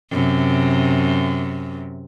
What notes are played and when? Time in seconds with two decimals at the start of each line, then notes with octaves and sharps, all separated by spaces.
0.11 F#2 C3